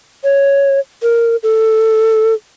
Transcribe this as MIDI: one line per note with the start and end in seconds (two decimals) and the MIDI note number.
0.24 0.80 73
1.02 1.36 70
1.43 2.34 69